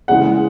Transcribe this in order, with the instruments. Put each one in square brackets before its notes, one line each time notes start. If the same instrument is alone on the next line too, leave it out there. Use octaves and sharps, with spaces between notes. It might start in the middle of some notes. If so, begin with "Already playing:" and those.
[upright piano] C#3 E3 G#3 F#5